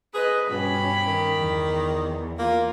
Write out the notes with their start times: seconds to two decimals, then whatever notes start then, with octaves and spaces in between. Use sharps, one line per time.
0.14 G#4 B4 D#5
0.50 G2 B2 C#4 G4 B5
1.08 D#3
1.38 E2
2.38 A#3 F4